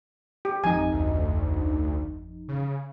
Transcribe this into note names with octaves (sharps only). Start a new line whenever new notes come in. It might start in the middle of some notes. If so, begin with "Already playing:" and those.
G4
G#1 F2 D#4 G#5
D2
C#3